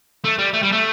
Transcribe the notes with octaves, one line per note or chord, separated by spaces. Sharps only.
A3
G3
A3
G3
A3